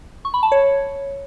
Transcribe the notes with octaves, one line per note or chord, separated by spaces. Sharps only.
C#6
B5
A5
C#5